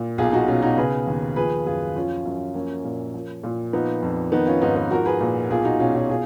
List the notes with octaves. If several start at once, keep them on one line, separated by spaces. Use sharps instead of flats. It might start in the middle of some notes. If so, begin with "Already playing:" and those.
Already playing: A#2
B1 F4 G#4
D#4 F#4
B2 C#4 F4
D#4 F#4
C#3 G#4 B4
D#2
F3 G#4 B4
F#2 F4 G#4
F3 C#4 F4
F#2
F3 A#3 C#4
A#2
F3
A#2
F3 B3 D#4
F2
D#3 B3 D#4
C#4 F4
G#2 B3 D#4
B3
F3 F#4 A#4
G#4 B4
A#2
B1 F4 G#4
D#4 F#4
B2 C#4 F4
C#4 F4
F4 G#4